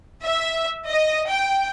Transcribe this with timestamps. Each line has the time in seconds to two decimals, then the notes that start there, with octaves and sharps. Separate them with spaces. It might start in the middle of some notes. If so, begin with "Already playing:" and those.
0.23 E5
0.89 D#5
1.29 G5